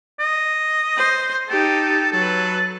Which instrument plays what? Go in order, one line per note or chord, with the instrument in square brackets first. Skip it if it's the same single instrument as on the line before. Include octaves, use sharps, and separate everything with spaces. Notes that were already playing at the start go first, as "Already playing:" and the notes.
[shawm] D#5
[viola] C5
[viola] D#4 G4 [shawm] A4
[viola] F#3 B4 [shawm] A4